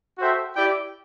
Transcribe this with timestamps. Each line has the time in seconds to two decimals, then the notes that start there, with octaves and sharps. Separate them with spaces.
0.18 F#4 A4 C5 E5 G5
0.55 E4 G4 D5 G5